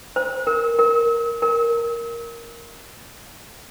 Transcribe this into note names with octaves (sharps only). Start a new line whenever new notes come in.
C5
A#4
A#4
A#4